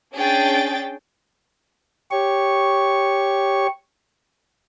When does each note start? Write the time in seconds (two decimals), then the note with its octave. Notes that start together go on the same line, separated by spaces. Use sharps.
0.15 C#4 D4 G#4 G5 A6
2.11 G4 C#5 C#6